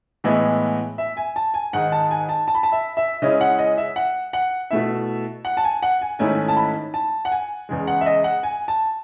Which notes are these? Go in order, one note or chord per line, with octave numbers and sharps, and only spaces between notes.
A2 E3 G#3 B3 E4 D#5
E5
G#5
A5
G#5
G#2 D#3 G#3 F#5
A5
G#5
A5
A5
B5
A5
E5
E5
C#3 G#3 C#4 E4 D#5
F#5
D#5
E5
F#5
F#5
B2 A3 E4 E5
F#5
A5
G#5
F#5
G#5
G#2 D#3 A3 C#4 E4 G#5
A5
B5
A5
F#5
G#5
E2 C#3 G#3
F#5
E5
D#5
F#5
G#5
A5